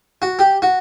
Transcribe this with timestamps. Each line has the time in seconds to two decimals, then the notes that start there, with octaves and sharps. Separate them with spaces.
0.22 F#4
0.39 G4
0.62 F#4